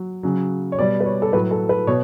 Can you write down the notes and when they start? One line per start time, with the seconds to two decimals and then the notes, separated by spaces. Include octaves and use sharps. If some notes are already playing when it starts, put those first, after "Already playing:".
Already playing: F#3
0.23 C#3 F#3
0.72 C#5
0.78 B2 G3 D5
1.00 B4
1.06 C#5
1.22 A4
1.32 A2 F#3 B4
1.51 A4
1.69 B4
1.87 B2 C#5